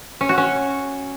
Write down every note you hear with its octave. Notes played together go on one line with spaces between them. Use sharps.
C#4
F#4
C#4